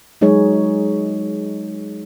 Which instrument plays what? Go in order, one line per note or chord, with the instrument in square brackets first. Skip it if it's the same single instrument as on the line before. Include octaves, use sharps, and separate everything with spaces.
[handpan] F#3 G#3 D#4 G#4 C#5